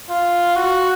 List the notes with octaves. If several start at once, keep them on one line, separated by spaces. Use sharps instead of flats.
F4
F#4